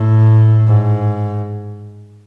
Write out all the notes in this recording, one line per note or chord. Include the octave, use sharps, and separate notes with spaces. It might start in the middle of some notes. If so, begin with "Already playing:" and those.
Already playing: A2
G#2